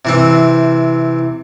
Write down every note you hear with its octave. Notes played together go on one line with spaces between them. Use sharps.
C3 E3 C4